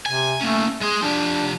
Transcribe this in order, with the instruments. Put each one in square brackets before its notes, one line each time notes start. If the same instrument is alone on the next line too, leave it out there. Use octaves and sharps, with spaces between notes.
[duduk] C3 [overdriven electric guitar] G#5
[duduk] A3 [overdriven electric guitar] A#3 C#4
[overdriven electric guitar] G#3 C6 [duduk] G#4
[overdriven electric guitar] F3 G4 [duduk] D4